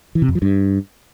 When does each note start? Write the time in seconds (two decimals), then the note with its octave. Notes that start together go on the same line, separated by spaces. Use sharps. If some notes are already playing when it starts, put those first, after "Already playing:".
0.15 E3
0.22 C3
0.29 F2
0.35 F3
0.42 G2